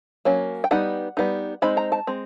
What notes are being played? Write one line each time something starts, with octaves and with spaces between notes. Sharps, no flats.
F#3 A#3 C#4
G5
G3 B3 D#4 F#5
G3 B3 D#4
G#3 C4 D#4 B5
A#5
A5
G#3 C4